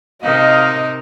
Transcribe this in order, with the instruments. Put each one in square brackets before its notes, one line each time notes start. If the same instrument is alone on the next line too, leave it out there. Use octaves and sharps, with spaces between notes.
[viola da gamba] C3 [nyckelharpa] D#4 A#4 [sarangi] D#5 [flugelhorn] F5